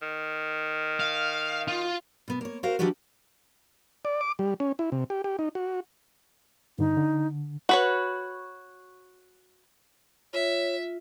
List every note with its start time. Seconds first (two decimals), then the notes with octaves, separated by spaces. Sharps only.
0.02 D#3
1.00 F5
1.68 F4
2.28 B2 B3
2.41 A#3 C#5
2.63 F#4 A#4 C5 F5
2.79 E3 F3 D4 D#4 F#4 G4
4.05 D5
4.21 D6
4.39 G3
4.60 C#4
4.79 E4
4.92 C3
5.10 G4
5.24 G4
5.39 D#4
5.55 F#4
6.79 G2 D3 D#4
6.97 D3
7.69 F#4 B4 C#5
10.33 F4 C#5 E5